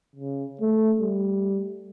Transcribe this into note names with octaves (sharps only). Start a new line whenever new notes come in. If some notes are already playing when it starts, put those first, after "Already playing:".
C#3
A3
G3